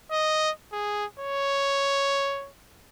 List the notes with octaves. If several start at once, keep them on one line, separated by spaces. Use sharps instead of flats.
D#5
G#4
C#5